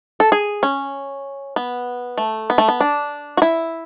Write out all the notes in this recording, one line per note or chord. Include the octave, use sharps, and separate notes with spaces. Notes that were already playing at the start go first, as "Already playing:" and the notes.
A4
G#4
C#4
B3
A3
B3
A3
B3
D4
F#4
E4